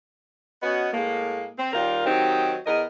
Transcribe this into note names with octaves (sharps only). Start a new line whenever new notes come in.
B3 C#4 F#4 D#5
A2 G#3 A#3
C4
D#2 G3 F4 A#4
D#3 F#3 C4 D#4 G4
E2 B3 A#4 D#5